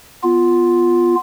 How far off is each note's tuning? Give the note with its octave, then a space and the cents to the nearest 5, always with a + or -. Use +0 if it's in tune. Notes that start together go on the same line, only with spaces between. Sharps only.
B3 +0 F4 +0